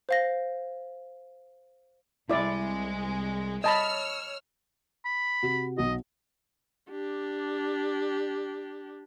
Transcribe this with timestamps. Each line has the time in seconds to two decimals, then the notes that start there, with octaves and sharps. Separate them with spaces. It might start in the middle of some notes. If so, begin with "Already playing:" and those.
0.09 C5 F5 A#6
2.30 C2 G#3 E4 D5
3.64 C#5 D#5 A5 B5 E6 F6
5.05 B5
5.43 C3 F#4
5.78 B1 B2 F#4 D#5
6.91 D4 G4